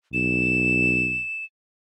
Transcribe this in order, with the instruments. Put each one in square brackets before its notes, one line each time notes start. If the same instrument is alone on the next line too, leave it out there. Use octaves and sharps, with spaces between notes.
[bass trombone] B1 [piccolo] E7